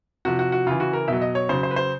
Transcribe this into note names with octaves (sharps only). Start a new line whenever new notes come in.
C3 F3 F#4
F#4
F#4
C#3 E3 F4
F#4
A#4
B2 F#3 E5
D#5
C#5
C#3 F#3 C5
C5
B4
C5